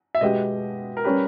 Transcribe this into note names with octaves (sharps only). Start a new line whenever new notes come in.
E5
B2 G#3 B3 G4 D#5
A#4
G3 C#4 G4 B4